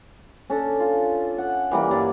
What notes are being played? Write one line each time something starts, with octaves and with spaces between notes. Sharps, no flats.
C#4 D4 A4
F4
F#5
E3 G3 A#3
G2 F#3 C#5 D5